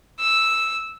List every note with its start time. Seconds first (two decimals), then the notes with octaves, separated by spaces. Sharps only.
0.20 E6